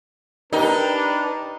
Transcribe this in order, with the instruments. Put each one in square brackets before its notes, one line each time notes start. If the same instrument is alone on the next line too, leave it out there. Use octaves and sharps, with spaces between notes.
[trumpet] D4 [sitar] D#4 [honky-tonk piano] G4 A#4 [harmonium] B4 A#5